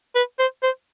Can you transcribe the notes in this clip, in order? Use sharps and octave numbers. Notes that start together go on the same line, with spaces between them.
B4
C5
C5